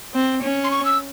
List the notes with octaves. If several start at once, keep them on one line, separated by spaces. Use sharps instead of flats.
C4
C#4
C6
C#6
E6